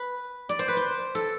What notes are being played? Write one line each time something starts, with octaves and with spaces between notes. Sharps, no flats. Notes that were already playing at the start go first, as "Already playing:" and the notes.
Already playing: B4
D5
C5
B4
C5
A4